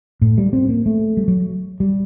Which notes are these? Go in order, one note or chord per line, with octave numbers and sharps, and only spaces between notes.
A2
G3
C4
A#3
A3
G3
F#3
G3